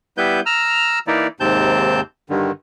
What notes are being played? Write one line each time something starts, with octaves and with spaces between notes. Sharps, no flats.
G3 B3 E4 B4 G6
A#5 E6 F6
E3 A#3 D#4 E4 D5
D#2 G#2 C3 C4 A5 G6
G2 D3 D#3